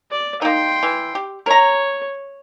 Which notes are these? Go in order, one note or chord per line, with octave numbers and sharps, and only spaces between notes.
D5
A#3 D#4 G5 C6
E3
G4
A#4 C#5 A#5